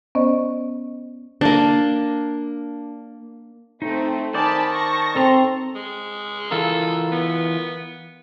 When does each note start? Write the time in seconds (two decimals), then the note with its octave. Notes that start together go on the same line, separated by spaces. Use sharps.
0.15 B3 C#4 C5 D5 D#5
1.41 A#3 D4
3.82 A3 C4 D#4
4.34 D#3 C5 D5 G#5 A5 B5 D6
4.69 A5 C#6 A#6
5.16 C4 A4 A#5 C6
5.75 G#3
6.51 E3 F4 A4 A#4
7.12 B3